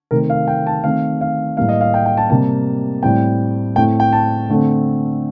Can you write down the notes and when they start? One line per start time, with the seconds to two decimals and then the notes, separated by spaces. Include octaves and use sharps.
0.11 C3 D#3 A3 C4 A#4
0.30 F5
0.48 G5
0.67 A5
0.84 D#3 A3 C4 F5
1.21 F5
1.57 A2 G3 A#3 F5
1.69 D#5
1.81 F5
1.94 G5
2.06 G5
2.17 A5
2.30 C3 G3 A#3 A5
3.03 A2 G3 C4 G5
3.76 A2 A3 C4 G5
4.00 G5
4.13 A5
4.49 D3 A3 C4